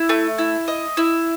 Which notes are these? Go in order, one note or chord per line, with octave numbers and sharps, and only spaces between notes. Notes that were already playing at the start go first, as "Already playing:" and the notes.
Already playing: E4
A3
E4
D#5
E4